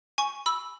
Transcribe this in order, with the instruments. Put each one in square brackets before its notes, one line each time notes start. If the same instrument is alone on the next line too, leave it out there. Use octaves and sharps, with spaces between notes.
[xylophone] G#5 C#6
B5 E6